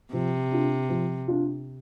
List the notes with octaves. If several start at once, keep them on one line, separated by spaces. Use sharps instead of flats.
C3 F3
D4 F4
F3
D4 F4